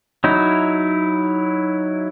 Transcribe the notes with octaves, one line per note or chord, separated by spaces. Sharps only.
F#3 D#4 E4